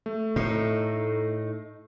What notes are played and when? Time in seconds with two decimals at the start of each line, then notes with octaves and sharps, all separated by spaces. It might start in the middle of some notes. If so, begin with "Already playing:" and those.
0.06 A3
0.36 A2 D#4